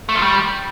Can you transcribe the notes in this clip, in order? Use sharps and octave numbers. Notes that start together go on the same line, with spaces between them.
A3
F3
G3